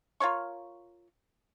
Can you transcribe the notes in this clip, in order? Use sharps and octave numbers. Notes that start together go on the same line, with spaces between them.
F4 A#4 C#5 C#6